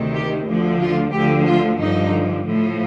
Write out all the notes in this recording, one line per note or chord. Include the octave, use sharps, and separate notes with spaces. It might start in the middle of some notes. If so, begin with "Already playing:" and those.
Already playing: D2 C3 D#3
G4
D2 D3 F3
F4
D2 D3 F3 G4
F4
G2 D3 F3 D#4
A2 F3